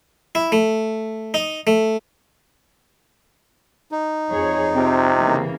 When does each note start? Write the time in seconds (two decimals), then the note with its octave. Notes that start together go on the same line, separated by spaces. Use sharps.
0.35 E4
0.52 A3
1.34 D#4
1.67 A3
3.92 D#4
4.30 F2 G#4 C#5
4.74 C3 C4 F4
5.23 C#3 E3 A#3